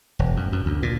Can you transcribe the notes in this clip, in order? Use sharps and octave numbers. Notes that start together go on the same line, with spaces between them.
E1
F#2
F#2
D2
A#2